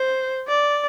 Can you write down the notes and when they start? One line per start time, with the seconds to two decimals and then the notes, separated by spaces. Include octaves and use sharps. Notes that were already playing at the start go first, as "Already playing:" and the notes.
Already playing: C5
0.47 D5